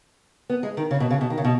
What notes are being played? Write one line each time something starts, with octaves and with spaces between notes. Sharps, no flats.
B3
G#3
D#3
C#3
B2
C#3
B2
D#3
C#3
B2